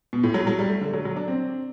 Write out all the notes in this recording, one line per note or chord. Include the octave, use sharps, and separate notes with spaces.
B2
A2
F#3
F#3
G3
A3
D3
F#3
F#3
D4
C4